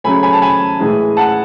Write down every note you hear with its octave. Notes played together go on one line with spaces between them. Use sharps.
C#3 F#3 A3 G#5 B5
G#5 B5
A5
G#5 B5
A2 E3 G#3
F#5 A5